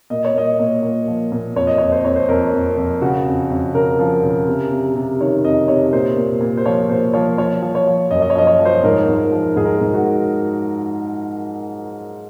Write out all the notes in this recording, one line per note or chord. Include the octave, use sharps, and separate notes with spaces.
A#2 D#5
C#5
A#2 D#5
A#2
A#2
F3
A#2
F2 C#5
D#5
F2 C#5
C5
F2 C#5
C5
F2 A#4
F2
F2
C#3 F#4
F2
F2
C#3 A#4
F3
C#3
C3
C3
C3
D#3 C#5
F2 D#5
C3 C#5
A#2 C5
A#2
A#2
C5
F3 C#5
A#2 C5
F3 C#5
F3 C#5
F3
C#5
F3
F#2 D#5
D#5
C#5
F3 D#5
C#5
F3
C5
G#2 A#4
G#2
F3
G#2 G#4
A#4
G#4
G#2
F#4